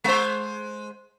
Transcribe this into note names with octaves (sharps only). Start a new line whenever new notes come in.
G#3 C5